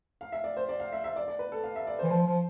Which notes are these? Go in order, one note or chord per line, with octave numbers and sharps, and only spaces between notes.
F5
E5
D5
C5
D5
F5
E5
E5
D5
D5
B4
A4
F5
E5
D5
C5
E3
F3 C5
F3